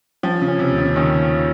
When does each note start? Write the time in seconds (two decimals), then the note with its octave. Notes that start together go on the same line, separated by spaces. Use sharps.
0.23 F3 C#4
0.42 C#3
0.48 C#4
0.59 C3
0.71 D#2
0.78 C#3
0.96 D#3 C#4
1.22 C#4